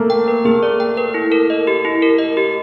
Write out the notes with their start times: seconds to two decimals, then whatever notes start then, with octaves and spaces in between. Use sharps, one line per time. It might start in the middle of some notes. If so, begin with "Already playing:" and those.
Already playing: A3 A#3
0.10 G5
0.28 B4
0.45 A#3 G#4
0.63 D5
0.80 G5
0.97 B4
1.14 E4
1.32 A#4
1.50 D#5
1.67 G4
1.85 E4
2.02 A#4
2.18 D#5
2.37 G4